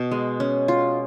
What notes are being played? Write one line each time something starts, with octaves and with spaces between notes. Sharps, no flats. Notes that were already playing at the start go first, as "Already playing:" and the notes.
Already playing: B2
G#3
C#4
F4